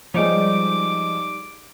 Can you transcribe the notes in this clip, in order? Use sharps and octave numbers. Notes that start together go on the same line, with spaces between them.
F3 G3 G#3 D#4 C#5 D6